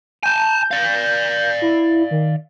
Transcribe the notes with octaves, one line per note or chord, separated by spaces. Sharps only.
G#5 A5 G6
D5 F5
E4
D#3